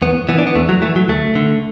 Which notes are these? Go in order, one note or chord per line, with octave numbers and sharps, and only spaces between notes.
E2 B3
E3 B3
D4
B3
E2 A3
F#3
E3 A3
F#3
D2 A3
D3